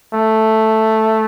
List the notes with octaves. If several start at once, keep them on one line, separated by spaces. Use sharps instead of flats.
A3